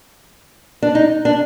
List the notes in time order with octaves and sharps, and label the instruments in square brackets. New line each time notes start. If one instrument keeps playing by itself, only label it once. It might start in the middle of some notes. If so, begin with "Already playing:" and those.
[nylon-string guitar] D4
D#4
D4